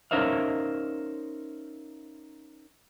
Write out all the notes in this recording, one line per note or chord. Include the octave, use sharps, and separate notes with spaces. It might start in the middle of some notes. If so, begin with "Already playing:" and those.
C#4 D#4 A#4 C5 E5 F5